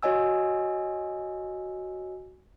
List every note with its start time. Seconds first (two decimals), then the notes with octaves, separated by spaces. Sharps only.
0.03 F#4 C#5 D#5 G#5 E6